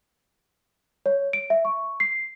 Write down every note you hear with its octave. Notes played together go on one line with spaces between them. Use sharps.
C#5
D7
E5
C#6
C7